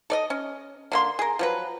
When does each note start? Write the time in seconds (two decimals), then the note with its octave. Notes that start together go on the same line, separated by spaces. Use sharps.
0.10 A4 D5 D#5
0.30 C#4
0.92 D3 A#3 C6
1.19 G#4 A#4
1.39 F3 F#3 B4